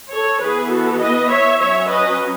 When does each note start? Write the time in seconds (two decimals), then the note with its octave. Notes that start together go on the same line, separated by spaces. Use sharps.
0.12 A4 C#5
0.41 E3 B3 G#4 B4
0.71 F#4 A4
1.00 B4 D#5
1.30 C#5 E5
1.59 F#3 C#4 C#5 E5
1.88 B4 D#5